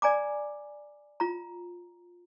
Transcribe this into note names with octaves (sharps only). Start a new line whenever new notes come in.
D5 G#5 A#5 D6
F4 A#5